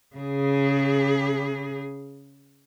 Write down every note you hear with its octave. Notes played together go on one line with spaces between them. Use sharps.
C#3 G#4